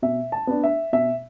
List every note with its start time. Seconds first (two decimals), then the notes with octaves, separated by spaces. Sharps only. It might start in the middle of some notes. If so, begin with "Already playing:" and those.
0.02 B2 E5
0.32 A5
0.47 B3 D4
0.64 E5
0.93 B2 E5